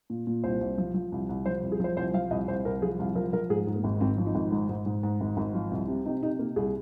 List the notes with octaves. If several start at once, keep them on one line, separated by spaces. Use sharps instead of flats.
A#2
A#2
C2 C5
C2
F3
F3
C2
C2
F3 C5
C2
G#4
F3 C5
C2 C5
F3 F5
C2 D#5
C2 C5
C2 A#4
F3 G#4
C2 F4
F3 A#4
F3 A#4
G#2 G#4
G#2
A#3
G#1
G#1 C4
F3
D#4
G#1
G#2
G#2
G#2
G#2
G#1
G#1
F3 F4
C2
C3
C3 D#4
C3 D#4
C3 A#3
C2 G#4